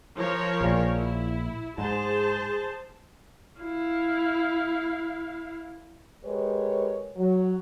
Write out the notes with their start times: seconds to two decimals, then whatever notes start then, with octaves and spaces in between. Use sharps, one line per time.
0.15 F3 A#4 C#5
0.61 A#1 A#2
0.94 E4
1.78 G#2 G#4 C5 A5
3.60 E4 F5
6.25 G#3 G4 A#4 B4 C#5
7.17 F#3